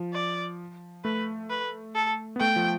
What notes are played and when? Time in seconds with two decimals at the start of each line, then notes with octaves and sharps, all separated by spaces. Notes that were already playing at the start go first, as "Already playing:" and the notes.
Already playing: F3
0.14 D5
1.04 A3 B4
1.50 B4
1.95 A4
2.36 B3
2.40 A3 G5
2.56 F3